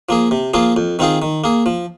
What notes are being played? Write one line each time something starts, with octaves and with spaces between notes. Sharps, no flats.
F3 A#3 G#4
C3
F3 A#3 F4 G#4
F2
D#3 C4 F4 G#4
D#3
A#3 G#4
F3